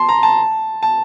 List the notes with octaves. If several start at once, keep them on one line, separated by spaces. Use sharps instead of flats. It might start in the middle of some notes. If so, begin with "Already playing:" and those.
Already playing: A5 C6
A#5
A5
A5